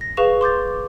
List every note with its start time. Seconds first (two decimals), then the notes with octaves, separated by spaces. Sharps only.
0.01 A#6
0.17 G#4 B4 F5 C#6 E7 F7
0.41 C6 D6 G6 A6